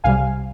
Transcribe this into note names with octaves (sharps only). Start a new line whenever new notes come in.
C2 C3 G3 F5 G#5